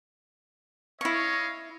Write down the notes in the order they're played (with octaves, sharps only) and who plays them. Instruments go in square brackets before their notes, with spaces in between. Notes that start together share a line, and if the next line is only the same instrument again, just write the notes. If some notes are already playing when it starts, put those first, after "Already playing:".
[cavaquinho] E4 C#6 [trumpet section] C#5 D#5 F5